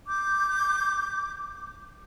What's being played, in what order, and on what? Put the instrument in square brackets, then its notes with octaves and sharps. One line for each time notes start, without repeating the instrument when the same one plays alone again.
[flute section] D6 G6